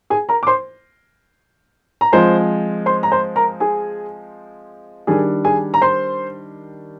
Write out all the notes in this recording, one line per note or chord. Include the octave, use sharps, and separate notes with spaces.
G#4 G#5
A#4 A#5
D6
C5 C6
A#5
F3 G#3 C4 C5 C6
C5 C6
A#5
C5 C6
A#4 A#5
G#4 G#5
D#3 G3 D4 G#4 G#5
G#4 G#5
A#5
C5 C6